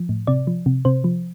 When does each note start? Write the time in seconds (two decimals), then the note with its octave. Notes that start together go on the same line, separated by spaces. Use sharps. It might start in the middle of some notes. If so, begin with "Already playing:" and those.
Already playing: F3
0.09 A2
0.27 C3 D5
0.47 F3
0.66 C3
0.85 C3 C5
1.04 F3